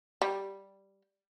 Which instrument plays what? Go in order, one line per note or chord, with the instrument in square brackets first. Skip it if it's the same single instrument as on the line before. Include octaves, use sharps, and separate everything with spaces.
[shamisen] G3